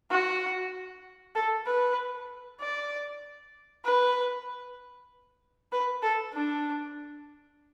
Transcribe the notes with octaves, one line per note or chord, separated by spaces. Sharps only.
F#4
A4
B4
D5
B4
B4
A4
D4